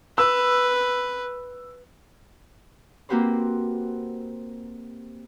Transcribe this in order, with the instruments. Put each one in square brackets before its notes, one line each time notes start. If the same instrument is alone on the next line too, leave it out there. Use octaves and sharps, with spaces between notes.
[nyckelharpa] B4 [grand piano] E6
[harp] A#3 C4 F#4 G4 B4 C5